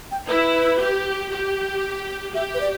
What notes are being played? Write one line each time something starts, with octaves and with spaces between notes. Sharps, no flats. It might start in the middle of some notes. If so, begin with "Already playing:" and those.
G5
E4 B4
G4
G4
G4 E5
B4
D5